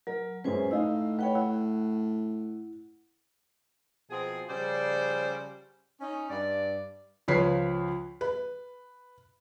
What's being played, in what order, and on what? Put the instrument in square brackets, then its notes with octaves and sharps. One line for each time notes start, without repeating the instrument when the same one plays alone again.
[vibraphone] F#3 [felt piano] A#4
[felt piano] F#2 G#3 C#4 [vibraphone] B4 C5 G#5
[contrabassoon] A2 [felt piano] D#4 D#5 F5 [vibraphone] E6
[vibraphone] B4 G5 B5 [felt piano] C#5 F#5
[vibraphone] E4 [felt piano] F#5
[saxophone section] B2 F3 C4 G#4
C#3 F3 G3 C#4 C5 D5
C#4 D#4
G2 D5
[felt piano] C#2 F3 B4 C#5 B6 C7
B4